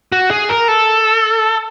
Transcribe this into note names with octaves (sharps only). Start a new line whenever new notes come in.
F#4
G#4
A#4
A4